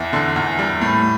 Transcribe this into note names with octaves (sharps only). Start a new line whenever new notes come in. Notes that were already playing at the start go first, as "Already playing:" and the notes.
Already playing: E2 E4
D3
E2
G3
A2